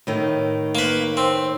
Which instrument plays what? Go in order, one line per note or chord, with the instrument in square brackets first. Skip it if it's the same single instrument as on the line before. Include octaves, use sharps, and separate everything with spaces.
[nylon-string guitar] A2 D#3 A3
[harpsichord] A#3 B4
C4